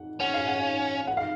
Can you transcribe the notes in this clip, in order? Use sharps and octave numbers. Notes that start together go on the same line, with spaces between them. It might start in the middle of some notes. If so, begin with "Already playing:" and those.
Already playing: F#5
C#4 F#5
F5
F#5
F#5
F5